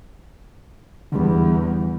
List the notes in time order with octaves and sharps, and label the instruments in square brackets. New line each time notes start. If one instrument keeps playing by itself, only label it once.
[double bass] E2 [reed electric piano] D3 G3